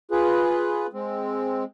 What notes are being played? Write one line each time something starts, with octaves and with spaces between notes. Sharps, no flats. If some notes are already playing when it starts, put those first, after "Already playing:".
F4 G#4 B4
G#3 C4